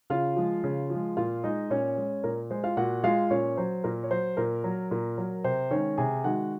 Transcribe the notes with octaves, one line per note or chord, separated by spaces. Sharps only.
C#3 F4 F5
F3 G#3
C#3
F3 G#3
A#2 F4 F5
G#3 D#4 D#5
A#2 C#4 C#5
G#3
A#2 A#4
G#3 C5
F4 F5
A#2 F#4 F#5
G#3 F4 F5
A#2 C#4 C#5
F#3 C5
A#2 A#4
C#5
F#3 C5
A#2 A#4
F#3
A#2
F#3
C3 C5
D#3 G#3 C#4 C#5
C3 G#4 G#5
D#3 G#3 F#4 F#5